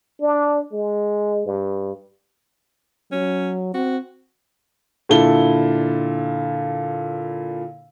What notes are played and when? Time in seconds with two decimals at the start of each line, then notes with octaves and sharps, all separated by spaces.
0.21 D4
0.73 G#3
1.46 G2
3.12 F#3 C#4
3.74 C4 F#4
5.09 A#2 D3 E4 A4 G7